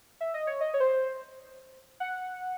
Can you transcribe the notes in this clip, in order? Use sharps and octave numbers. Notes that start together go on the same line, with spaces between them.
E5
D#5
C#5
D#5
C#5
C5
F#5